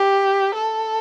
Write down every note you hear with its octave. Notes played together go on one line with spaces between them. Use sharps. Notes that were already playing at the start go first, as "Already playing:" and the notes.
Already playing: G4
A4